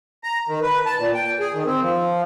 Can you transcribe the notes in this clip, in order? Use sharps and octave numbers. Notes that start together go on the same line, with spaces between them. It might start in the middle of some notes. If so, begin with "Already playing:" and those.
A#5
D#3
B4
A5
A#2
G5
G#4
D#3
C4
F3